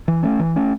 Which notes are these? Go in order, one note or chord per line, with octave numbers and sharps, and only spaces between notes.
E3
A3 C#4
E3
A3 C#4